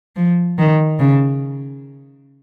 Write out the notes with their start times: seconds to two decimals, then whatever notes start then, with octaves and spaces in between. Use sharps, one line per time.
0.16 F3
0.58 D#3
0.99 C#3